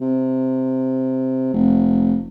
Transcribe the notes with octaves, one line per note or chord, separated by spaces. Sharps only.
C3
F1